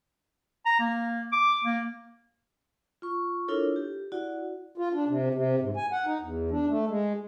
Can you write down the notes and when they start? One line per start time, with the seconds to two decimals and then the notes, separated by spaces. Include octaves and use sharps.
0.66 A#5
0.80 A#3
1.32 D6
1.64 A#3
3.02 F4 C#6
3.48 D4 E4 F4 A4 A#4 C#5
3.76 G4
4.12 E4 F#4 D5 F#5
4.78 F4
4.93 D4
5.08 C3
5.34 C3
5.61 G#2
5.76 G#5
5.92 F#5
6.06 D#4
6.21 E2
6.51 D4
6.69 A3
6.88 G#3